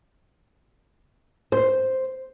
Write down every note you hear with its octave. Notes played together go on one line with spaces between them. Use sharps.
C5